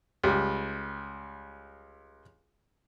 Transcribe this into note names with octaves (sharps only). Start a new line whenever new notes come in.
C#2 G3